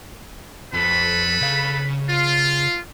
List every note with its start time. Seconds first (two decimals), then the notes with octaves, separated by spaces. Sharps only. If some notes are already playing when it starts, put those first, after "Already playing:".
0.73 F2 A4 B4 B5
1.41 C#3 F5
2.09 F4